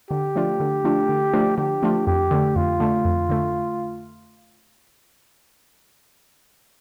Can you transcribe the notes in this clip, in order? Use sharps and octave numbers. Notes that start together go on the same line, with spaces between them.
D3 G4
F3 A3 D4 F4
D3
F3 A3 D4 F4
D3
F3 A3 D4 F4
D3 G4
F3 A3 D4 F4
F2 G4
D3 A3
F2 F4
D3 A3
F2
D3 A3